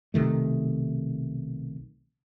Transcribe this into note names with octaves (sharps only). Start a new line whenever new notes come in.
B1 C3 D#3 A3